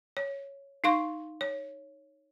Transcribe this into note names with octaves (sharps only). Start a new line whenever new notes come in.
C#5
D#4 F5 C6 C#6
C#5